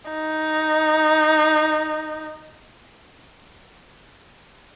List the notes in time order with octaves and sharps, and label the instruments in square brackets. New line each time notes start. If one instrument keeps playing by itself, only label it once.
[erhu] D#4